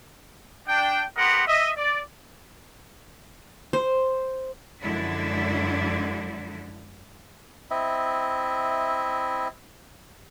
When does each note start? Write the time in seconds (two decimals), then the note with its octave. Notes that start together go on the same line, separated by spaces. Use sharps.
0.68 D4 G5
1.17 B3 G4 A#4 D#5 F#5 C6
1.47 D#5 E5
1.77 D5
3.73 C5
4.82 F#2 D3 F3 G#3 D4 E4
7.71 C4 E4 D#5 E5